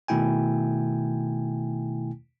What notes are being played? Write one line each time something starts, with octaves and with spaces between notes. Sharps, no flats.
B2 D#3 A3 E4 G5 G#5